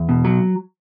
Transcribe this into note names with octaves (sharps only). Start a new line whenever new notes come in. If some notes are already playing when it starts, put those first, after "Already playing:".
Already playing: E2
B2
F#3